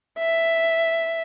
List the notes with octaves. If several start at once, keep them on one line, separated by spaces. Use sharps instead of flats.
E5